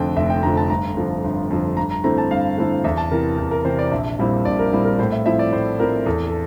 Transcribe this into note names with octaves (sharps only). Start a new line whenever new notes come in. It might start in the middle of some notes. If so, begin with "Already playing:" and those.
Already playing: F1 F2 D3 F3 G5
F1 E5
G5
F2 D3 F3 A#5
A5
G1 A#5
F2 D3 F3
G1
F2 D3 F3
G2 A#5
A#5
D3 A3 C4 E4 A#5
A5
G2 F5
D3 A3 C4 E4
E2 E5
A5
C3 E3 A#4
E2
A#4
C3 E3 C5
D5
A#1 E5
A#2 G3 C4 E4
A#1 D5
A#4
A#2 G3 C4 E4
A#4
A2 C5
E5
F3 C4 E4 E5
D5
A2 C5
F3 C4 E4 A#4
E2 A4
A4